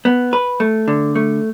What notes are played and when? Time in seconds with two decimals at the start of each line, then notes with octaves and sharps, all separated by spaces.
0.05 B3
0.33 B4
0.60 A3
0.88 D3
1.16 A3